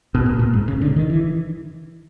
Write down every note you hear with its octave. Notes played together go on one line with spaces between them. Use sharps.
B2
A#2
A#2
G#2
C#3
D3
D#3
E3